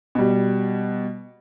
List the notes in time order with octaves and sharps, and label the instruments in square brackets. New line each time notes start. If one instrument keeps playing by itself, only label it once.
[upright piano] B2 G3